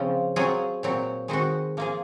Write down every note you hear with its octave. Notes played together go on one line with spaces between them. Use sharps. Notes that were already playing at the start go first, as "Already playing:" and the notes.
Already playing: C#3 F3 C4 F4
F#3 C4 F4 G#4
A#2 F#3 C4
D#3 G#3 C4 F#4
F3 A#3 F4 G#4